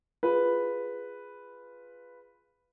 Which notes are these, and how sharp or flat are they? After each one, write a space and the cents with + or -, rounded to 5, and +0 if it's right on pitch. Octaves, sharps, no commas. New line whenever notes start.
F4 +0 G#4 +0 B4 +0